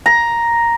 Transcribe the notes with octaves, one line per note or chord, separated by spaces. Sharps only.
A#5